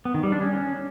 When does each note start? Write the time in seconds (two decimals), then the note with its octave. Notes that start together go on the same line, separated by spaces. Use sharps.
0.05 B3
0.14 D#3
0.23 G3
0.32 D4
0.41 C#4